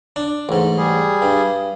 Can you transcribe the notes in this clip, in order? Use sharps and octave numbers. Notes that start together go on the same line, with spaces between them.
D4
A1 G#2
G3 G#4
G2